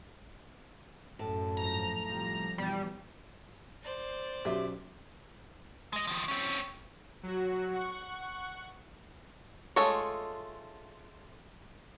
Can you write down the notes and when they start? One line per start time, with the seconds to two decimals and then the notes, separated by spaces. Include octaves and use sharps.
1.19 F#2 A2 A5
1.57 G#2 F3 A#5
2.07 C3 F3 G3
2.58 F1 B2 E3 G3
3.83 C5 D5
4.45 B1 F#2 F#3 G4 E5
5.93 G#3 D#5
6.07 D#3 F3
6.28 C4 C#4
7.23 F#3 F#4
7.73 F#5 C#6
9.76 G#3 A3 F4 A4 C#5